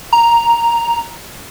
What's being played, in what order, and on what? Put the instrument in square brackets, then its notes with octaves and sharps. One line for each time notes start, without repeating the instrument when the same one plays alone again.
[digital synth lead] A#5